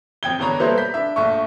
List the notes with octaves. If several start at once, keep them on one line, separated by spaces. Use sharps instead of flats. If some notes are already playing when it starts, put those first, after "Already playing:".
F2 G5 G#6 G7
E2 D3 D4 C#5 A#5 B5
G3 A#3 B3 A4 C5 E5
B5 G6 B6
D4 E5
A#1 A3 C#6